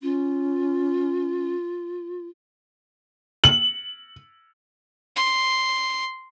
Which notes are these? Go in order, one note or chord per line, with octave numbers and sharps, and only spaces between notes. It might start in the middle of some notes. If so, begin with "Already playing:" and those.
C#4 F4
F#7
C6